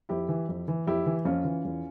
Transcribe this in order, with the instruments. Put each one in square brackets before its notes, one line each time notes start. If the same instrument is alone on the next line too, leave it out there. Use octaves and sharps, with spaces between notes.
[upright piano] F2 E4 G4
E3
F2
E3
F2 E4 G4
E3
F2 C#4 F4
E3
E2